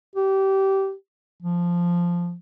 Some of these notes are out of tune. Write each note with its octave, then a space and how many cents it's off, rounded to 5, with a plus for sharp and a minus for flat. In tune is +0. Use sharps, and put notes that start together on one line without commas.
G4 -20
F3 -5